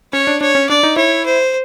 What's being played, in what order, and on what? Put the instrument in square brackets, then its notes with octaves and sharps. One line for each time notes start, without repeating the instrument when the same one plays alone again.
[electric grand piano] C#4 [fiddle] C#5
[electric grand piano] D4
[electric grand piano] D4 [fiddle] C#5
[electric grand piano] C#4
[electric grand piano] D4 [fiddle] D5
[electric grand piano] D#4
[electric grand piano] E4 [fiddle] C#5
[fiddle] C5